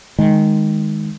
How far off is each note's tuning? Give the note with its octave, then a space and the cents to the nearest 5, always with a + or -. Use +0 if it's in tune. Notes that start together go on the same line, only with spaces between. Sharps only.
D#3 +0 G#3 +0